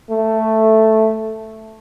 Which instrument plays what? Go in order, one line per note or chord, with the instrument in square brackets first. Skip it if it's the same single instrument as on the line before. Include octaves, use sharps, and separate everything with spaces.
[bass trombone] A3